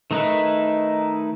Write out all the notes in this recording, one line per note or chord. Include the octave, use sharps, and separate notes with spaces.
D#3 A3 D#4 E4 B4